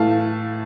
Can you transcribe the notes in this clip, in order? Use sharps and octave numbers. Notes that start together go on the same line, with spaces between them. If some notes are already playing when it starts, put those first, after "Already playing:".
Already playing: A2 E3 A3 F5 A5